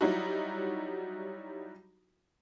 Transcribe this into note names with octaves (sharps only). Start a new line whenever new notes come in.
F#3 G3 D#4 E4 F#4